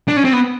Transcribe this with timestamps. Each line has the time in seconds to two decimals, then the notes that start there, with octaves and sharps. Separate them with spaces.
0.08 D4
0.17 C#4
0.24 C4
0.33 B3